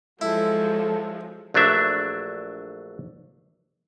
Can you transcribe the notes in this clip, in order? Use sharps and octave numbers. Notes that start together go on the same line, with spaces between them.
F3 F#3 G#3 E4 A4
A#1 F#3 A3 D4 E5